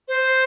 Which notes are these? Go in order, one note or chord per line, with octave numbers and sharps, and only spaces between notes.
C5